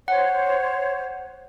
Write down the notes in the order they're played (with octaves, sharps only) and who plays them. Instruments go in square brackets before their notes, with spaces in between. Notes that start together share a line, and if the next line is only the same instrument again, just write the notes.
[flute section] C5 C#5 [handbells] F#5